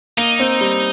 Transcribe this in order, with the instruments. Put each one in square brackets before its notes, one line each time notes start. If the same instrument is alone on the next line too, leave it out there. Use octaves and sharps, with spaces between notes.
[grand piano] A#3 [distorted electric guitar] D#4
[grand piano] C4
G3